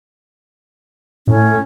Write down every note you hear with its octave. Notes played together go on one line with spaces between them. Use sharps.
A2 C#4